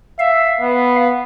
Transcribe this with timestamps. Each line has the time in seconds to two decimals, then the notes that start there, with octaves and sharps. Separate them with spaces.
0.19 E5 F5
0.61 B3